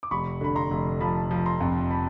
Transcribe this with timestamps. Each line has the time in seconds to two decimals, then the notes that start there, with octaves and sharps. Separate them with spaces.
0.03 D6
0.11 F1 B5 C#6
0.41 D3 B5
0.56 A#5 C6
0.71 F1
1.01 F3 A5 B5
1.31 F3
1.46 A#5 C6
1.60 F2
1.91 A5 B5